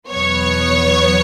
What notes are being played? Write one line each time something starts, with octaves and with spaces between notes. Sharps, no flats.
E2 B2 F#3 B3 C#5